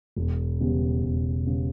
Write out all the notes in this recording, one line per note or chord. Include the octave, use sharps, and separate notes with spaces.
E1
E2 C#3 G3 B3
E1
C#3 G3 B3